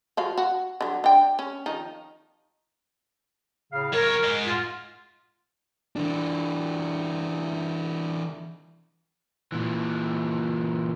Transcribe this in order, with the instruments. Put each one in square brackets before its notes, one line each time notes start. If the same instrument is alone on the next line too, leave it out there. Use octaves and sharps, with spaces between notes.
[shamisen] F3 F#4 F5
F#4
D3 F#3
D4 G5
C#4
D#3 F3 D#4
[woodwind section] A2 C#3 F5
[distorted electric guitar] B1 C#5 [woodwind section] A#4
[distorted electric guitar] G#2 G#3
[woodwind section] F4
[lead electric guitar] E3 D4
[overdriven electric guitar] A#2 E3